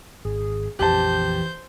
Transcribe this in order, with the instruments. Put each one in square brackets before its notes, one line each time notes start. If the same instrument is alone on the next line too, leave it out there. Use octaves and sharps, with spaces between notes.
[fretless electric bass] G#1 [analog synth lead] G#4
[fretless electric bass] A#1 F2 [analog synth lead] E3 [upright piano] G4 A5 [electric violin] C5 G6